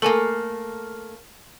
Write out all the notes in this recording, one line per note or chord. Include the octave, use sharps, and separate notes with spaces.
A3 A#3 A4 A#4 G#5